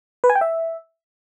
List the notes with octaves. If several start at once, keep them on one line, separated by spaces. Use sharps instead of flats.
B4
G#5
G5
E5